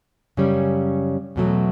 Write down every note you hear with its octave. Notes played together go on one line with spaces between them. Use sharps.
F#2 C#3 G3 C#4
E2 B2 F#3 A3